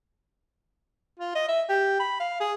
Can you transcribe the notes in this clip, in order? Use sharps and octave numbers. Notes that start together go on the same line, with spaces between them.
F4
D#5
E5
G4
B5
F5
G#4